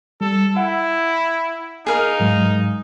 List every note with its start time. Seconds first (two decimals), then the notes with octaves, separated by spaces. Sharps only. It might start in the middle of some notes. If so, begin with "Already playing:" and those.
0.21 G3 A4
0.57 E4 F#5
1.87 D#4 G#4 A#4 F5
2.20 G#2 F#3 G#3